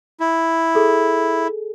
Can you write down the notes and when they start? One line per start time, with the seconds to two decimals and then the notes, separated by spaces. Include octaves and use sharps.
0.20 E4
0.75 G#4 A4